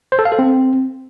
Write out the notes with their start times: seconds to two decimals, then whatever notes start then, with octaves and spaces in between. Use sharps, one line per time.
0.12 C5
0.19 A4
0.25 F5
0.32 A4
0.39 C4